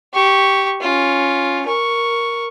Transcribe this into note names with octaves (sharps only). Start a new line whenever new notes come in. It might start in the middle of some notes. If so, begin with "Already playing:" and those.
G4 C#6
C#4 F4
A#4 C#6